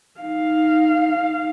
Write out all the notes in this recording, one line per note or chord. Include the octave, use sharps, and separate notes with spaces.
D#4 F5